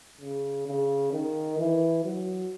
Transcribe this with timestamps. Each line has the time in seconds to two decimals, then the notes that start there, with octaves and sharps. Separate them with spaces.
0.21 C#3
0.67 C#3
1.13 D#3
1.59 E3
2.04 F#3